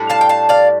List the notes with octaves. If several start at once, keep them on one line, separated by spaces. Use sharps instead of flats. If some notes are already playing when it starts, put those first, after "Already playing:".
Already playing: A2 G3 D4
F5 A5
G5
F5 A5
D5 F5